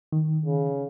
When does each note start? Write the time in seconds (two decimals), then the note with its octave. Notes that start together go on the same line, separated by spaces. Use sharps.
0.12 D#3
0.46 C#3